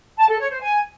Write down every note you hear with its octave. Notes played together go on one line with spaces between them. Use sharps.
A5
A4
C#5
C5
G#5